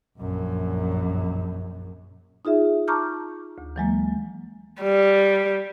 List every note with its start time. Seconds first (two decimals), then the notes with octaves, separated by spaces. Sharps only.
0.18 A#1 F#2
2.45 D#4 F4 G#4 E5
2.88 A5 A#5 C#6 D6 F6 G6
3.58 D2
3.76 E3 F#3 G#3 A#3
4.81 G3